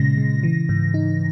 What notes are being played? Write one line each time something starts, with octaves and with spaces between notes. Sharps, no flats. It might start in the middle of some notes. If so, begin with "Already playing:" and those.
Already playing: A#2 C#3 G#3 A#6
C#3
E3
G#2
D#4